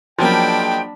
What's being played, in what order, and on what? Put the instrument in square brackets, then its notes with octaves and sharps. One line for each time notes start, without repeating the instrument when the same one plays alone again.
[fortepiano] F3 F#3 A#3 [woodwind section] G#3 F4 G5 [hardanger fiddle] D4 B5